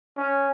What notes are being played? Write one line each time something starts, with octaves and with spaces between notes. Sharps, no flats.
C#4